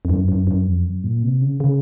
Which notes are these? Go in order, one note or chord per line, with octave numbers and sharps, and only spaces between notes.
F2
F#2
F#2
F#2
F2
F#2
A#2
C3
C#3
C#3